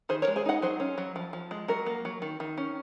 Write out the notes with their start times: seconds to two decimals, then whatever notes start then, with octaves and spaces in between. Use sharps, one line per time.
0.09 D#3 G#4 C5
0.22 A#4 C#5
0.27 G#3
0.36 G#4 C5
0.46 D#4 D#5 F#5
0.62 F#3 G#4 C5
0.80 C#4
0.98 F#3
1.16 F3
1.33 F3
1.51 G#3
1.68 F#3 F#4 A#4
1.86 A#3
2.05 F#3
2.22 D#3
2.40 D#3
2.58 C#4